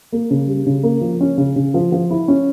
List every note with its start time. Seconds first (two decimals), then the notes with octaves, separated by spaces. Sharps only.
0.12 A#3
0.31 C#3
0.47 G3
0.66 C#3
0.83 A#3
1.01 F3
1.21 C#4
1.37 C#3
1.56 C#3
1.74 F3
1.92 F3
2.10 E4
2.28 C#4